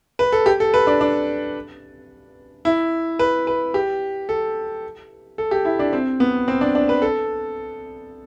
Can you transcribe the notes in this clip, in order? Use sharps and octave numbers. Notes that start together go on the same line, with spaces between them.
B4
A4
G4
A4
B4
D4
D4
E4
B4
B4
G4
A4
A4
G4
E4
D4
C4
B3
C4
D4
D4
B4
A4